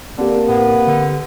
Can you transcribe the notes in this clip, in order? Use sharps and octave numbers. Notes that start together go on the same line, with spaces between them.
D3 A#3 C4 G4
A2 B3
D3